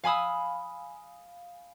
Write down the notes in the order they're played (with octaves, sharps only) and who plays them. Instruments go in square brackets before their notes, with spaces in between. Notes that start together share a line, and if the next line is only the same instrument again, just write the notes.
[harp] F5 G#5 B5 D#6 E6